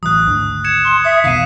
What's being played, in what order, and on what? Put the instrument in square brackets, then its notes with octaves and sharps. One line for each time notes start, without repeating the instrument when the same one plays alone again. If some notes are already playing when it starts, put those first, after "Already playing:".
[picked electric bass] A1 E3 F#3 [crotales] D#6 F#6
[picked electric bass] G#1 D2 D3
[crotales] G#6 C#7 E7
[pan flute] C6
[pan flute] E5 [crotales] D#6
[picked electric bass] E2 B2 D#3 [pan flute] F5 [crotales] B6 D#7